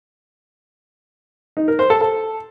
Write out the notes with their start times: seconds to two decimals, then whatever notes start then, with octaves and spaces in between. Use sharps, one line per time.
1.57 D#4
1.68 A#4
1.79 C5
1.90 A4
2.01 A4